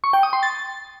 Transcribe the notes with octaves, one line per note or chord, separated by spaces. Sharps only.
C#6
G5
D#6
C6
A6